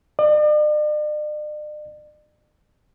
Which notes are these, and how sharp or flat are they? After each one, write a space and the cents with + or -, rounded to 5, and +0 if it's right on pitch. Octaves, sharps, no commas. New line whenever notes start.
D5 +45